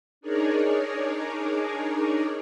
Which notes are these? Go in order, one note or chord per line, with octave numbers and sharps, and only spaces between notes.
D4 D#4 G#4 A#4 C#5 D5